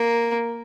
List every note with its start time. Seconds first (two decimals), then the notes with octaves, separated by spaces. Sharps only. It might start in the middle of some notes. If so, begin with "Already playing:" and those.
Already playing: A#3